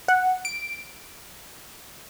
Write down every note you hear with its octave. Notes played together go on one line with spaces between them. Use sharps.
F#5
D7